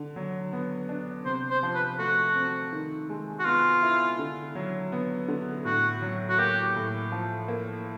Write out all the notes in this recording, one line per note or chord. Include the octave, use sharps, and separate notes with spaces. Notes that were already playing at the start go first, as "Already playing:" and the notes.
Already playing: D3
F#3
B3
D4
C3 C5
C5
F3
B4
A3 F#4
C4
D#3
G#3
F#4
B3 F4
E4
D3
F#3
B3
D3
A2 F#4
F#3
F#4
A#3 G4
A2
F3
A#3